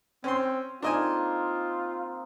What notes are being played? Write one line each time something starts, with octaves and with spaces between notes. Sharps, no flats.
C4 C#4 C6
A#3 C4 D4 D#4 F4 D#5 G#5